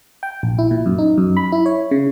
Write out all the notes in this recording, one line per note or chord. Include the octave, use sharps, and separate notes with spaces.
G5
A#1
E4
A#2
F#2
D#4
F#2
B5
E4
C#5
C#3